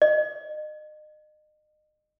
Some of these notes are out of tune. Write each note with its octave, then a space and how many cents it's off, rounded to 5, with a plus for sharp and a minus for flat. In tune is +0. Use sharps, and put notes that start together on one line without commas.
D#5 -35